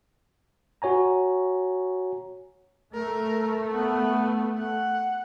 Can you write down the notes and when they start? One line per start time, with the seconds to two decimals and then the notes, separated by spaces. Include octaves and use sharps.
0.82 F#4 C#5 G#5 A#5
2.94 A3 A#4
3.72 B3
4.58 F#5